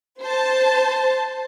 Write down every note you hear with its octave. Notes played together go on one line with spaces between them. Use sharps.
C5 A5